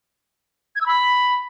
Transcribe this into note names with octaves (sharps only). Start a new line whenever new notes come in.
G#6
E6
B5